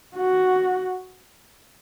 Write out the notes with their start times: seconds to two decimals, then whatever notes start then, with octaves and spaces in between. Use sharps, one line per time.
0.17 F#4